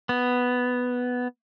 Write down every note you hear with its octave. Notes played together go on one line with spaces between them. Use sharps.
B3